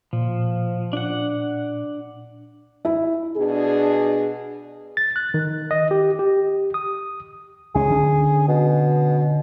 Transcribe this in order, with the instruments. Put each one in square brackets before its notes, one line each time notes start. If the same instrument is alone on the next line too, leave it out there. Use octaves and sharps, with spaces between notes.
[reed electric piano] A#2 [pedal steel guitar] F3
[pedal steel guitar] D4 F#5
[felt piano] E4
[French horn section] B2 D4 G#4
[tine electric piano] A6
F#6
D#3
D#5
G4
G4
D#6
[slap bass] C#2 C#4 [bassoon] G#4
[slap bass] D3 C#4
[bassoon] B2